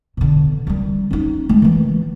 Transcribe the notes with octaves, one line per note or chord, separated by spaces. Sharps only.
B2 D3
D#3 G3
C#4 D#4
G#3 A3
D#3 E3